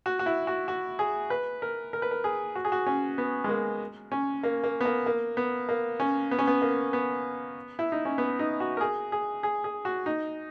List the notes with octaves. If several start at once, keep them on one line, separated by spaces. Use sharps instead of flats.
F#4
F#4
E4
F#4
F#4
G#4
B4
A#4
A#4
B4
A#4
G#4
F#4
G#4
F#4
C#4
B3
G#3
A#3
C#4
A#3
A#3
B3
A#3
A#3
B3
A#3
C#4
B3
C#4
B3
A#3
B3
E4
D#4
C#4
B3
D#4
F#4
A#4
G#4
G#4
G#4
G#4
F#4
D#4